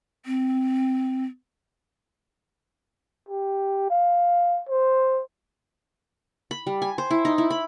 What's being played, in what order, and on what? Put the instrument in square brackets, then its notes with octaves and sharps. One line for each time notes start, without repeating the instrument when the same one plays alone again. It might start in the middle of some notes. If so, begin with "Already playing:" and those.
[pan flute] C4
[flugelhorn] G4
F5
C5
[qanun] B5
G3
G#5
C5
E4
D#4
E4
B5